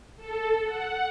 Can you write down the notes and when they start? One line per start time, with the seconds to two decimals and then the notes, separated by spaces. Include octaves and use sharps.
0.17 A4
0.63 F#5